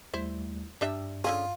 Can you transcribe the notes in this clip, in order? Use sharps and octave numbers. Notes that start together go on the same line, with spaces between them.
D#2 G3 A3 E4 C5
G2 G3 D4 E5
D3 C#4 F4 G#4